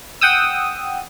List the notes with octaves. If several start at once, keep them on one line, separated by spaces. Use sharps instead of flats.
F#5 G5 D#6 E6